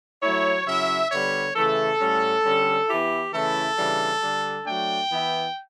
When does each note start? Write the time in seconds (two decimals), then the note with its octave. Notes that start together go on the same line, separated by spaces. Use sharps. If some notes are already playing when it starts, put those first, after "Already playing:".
0.22 F#3 A3 E4 C#5
0.66 C#3 F#3 C#4 E4 E5
1.11 D3 G3 B3 C#5
1.56 C#3 E3 A3 A4
2.00 A2 G3 C#4
2.44 D3 G3 C#4
2.88 E3 B3 E4 G4
3.33 C#3 E3 A3 C#4 E4 A4
3.77 C#3 E3 G3 D4
4.22 D3 G3 D4
4.66 F#3 A3 D4 G5
5.10 E3 B3 E4